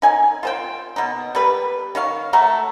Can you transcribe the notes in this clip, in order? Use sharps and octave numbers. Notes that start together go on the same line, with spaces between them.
D#4 G#5
F4 C5 G5
B2 D#4
G3 B4
D#3 C#5 F5
A3 F#4 A#5